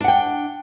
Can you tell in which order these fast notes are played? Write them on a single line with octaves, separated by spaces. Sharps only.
D4 F#5 G5